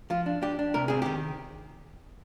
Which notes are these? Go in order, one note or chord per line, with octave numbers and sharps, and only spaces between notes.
F3 F4
D4
D4 G4
D4
C3 A#4
C4 G#4
D#3 G4